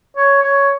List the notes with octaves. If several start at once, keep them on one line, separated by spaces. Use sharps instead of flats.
C#5
C#5